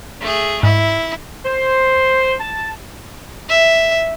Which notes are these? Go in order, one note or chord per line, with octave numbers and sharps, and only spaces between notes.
A3 G#4
G#2 E4
C5
A5
E5